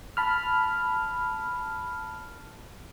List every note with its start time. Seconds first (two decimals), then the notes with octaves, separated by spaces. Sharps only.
0.17 A5 B5 F6